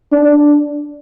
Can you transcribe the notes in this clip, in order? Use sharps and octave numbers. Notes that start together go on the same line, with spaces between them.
D4